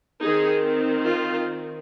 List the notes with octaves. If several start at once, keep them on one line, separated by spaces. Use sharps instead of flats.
D#3 C4 D#4 G#4
F4